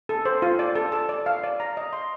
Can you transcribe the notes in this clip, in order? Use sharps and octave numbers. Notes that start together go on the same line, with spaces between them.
A4
C5
F4
D5
A4
A5
D5
F5
D5
A#5
D#5
C6